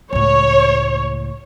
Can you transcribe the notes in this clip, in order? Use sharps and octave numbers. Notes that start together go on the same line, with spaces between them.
C#2 A2 C#5